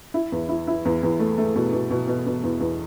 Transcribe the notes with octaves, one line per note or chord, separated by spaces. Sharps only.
E4
E2
E4
E4
E2
E2
A3
A3
B2
B2
B2
B2
B2
E2
E2